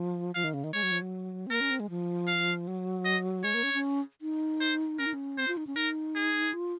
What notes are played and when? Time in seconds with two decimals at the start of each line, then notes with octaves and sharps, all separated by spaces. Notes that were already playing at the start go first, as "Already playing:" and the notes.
Already playing: F3
0.35 F3 F5
0.44 D#3
0.54 C#3
0.64 D#3
0.73 G#3 C#5
0.83 F#3
0.92 F3
1.02 F#3
1.47 C4
1.50 A#3 A#4
1.61 C#4
1.71 C4
1.80 G#3
1.90 F3
2.28 F5
2.67 F#3
3.05 D#5
3.44 G#3 C#5
3.54 A#3
3.63 C#4
3.74 C#4
4.22 D#4
4.61 C5
4.99 C#4 A#4
5.06 D#4
5.14 C#4
5.38 C4 C5
5.48 F4
5.57 D#4
5.67 C#4
5.76 D#4 A#4
6.16 G#4
6.53 F4